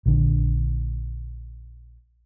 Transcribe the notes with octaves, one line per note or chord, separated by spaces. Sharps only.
A#1 D3